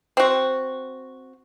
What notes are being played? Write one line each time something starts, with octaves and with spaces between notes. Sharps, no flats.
C4 F#4